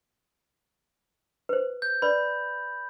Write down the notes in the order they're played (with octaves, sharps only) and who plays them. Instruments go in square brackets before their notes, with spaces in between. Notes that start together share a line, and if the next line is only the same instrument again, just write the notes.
[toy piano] B4 C5
[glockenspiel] G6
[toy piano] B4 D5 [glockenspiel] B5